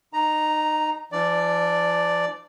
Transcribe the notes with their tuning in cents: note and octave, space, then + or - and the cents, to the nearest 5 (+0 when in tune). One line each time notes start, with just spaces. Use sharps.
D#4 -25 A#5 +0
F3 -45 D4 +20 D5 +0